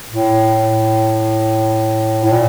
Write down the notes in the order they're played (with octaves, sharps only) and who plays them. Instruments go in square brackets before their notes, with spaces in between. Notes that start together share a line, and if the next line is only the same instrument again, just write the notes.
[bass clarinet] A2
A2
A#2